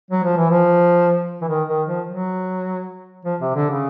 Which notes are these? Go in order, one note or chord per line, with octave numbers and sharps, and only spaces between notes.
F#3
F3
E3
F3
E3
D#3
D#3
F3
F#3
F3
C3
D3
C#3